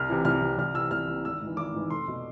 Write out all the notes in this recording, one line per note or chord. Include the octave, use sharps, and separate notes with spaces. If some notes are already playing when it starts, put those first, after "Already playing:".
Already playing: C2 F6
C3 E3
C2 F6
C3 E3
C2 F6
C3 E3 E6
C2 F6
C3 E3
G#1 E6
G#2 E3
G#1 D6
G#2 E3
F1 C6
B2